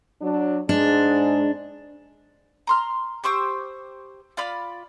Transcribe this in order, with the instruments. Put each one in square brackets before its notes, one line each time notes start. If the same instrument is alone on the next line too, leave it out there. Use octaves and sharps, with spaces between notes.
[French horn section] F#3 D4
[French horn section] G#2 G#3 [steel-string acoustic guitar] D4
[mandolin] A#5 C6 F6
G4 C5 C#6 E6
F4 D5 B5 F6